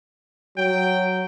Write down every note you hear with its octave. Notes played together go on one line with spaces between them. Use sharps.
F#3 G5